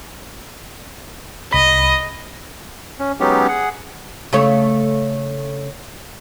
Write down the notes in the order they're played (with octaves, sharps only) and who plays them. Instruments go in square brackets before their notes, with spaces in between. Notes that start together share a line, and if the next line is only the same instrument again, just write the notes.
[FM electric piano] C2 B5 [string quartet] D#5
[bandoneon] C#4
F#3 G#3 B3 C#4 D#4 G4
G#4 F#5
[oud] C#3 A3 C#5